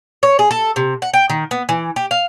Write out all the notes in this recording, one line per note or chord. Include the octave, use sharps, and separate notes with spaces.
C#5
G#4
A4
C3
F#5
G5
D#3
B3
E3
G4
F5